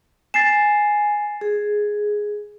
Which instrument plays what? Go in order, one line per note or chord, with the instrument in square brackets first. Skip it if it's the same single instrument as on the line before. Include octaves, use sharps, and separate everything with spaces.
[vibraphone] G#5 [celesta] A6 C7 E7
[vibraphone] G#4